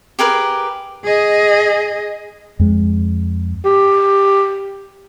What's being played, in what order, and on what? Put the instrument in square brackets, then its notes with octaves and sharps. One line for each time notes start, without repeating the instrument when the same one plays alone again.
[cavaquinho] G4 G#4 A#4 B4
[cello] G#4 D#5
[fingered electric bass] F2 G#3
[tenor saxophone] G4